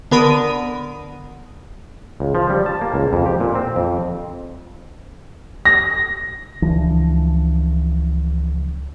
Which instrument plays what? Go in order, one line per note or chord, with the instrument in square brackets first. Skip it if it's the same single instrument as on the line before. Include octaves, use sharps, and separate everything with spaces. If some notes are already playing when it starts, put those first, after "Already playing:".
[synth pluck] D3 B3 A#4 B5 D#6 D#7
[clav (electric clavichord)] C#2
F3
G3
A5
A#3
C#2
F2
G4
A#2
C4
F2
[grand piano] A#6
[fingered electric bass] C#2 E3 F3 D4